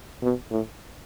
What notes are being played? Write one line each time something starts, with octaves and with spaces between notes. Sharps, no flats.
B2
A2